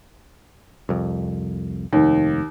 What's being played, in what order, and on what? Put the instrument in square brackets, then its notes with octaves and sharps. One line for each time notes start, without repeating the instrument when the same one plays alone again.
[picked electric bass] C2 F2
[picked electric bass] F1 [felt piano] D#2